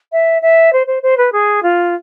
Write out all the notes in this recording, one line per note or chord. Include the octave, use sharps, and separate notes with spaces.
E5
E5
C5
C5
C5
B4
G#4
F4